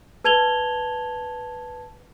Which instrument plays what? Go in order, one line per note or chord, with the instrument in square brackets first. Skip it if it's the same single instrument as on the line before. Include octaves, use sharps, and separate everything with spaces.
[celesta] B4 A5 G#6 F7 G7